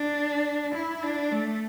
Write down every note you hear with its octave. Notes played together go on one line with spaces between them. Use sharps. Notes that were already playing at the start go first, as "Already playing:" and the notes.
Already playing: D4
E4
D4
A3